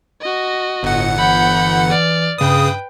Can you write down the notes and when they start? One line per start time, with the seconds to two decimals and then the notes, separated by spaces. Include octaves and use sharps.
0.21 F#4 D#5
0.83 G1 A2 F#5
1.18 E3 B5 G6
1.91 D5 F6
2.38 G2 C#3 B4 G5 D#6